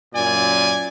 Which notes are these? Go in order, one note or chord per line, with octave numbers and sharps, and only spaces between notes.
F#2 A#2 D5 G#5